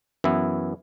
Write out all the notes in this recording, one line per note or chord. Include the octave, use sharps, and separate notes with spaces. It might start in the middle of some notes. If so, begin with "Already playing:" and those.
F#2 E3 B3 E4